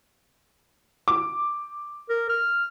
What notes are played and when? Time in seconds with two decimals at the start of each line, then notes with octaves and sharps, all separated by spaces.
1.08 D6
2.10 A#4
2.30 F6